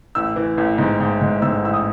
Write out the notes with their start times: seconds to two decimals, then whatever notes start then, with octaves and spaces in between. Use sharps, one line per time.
0.15 A1 E6
0.36 E3
0.57 A1
0.78 G#2
1.00 G#2
1.21 G#2
1.42 G#2 E6
1.63 A1 E6
1.73 D#6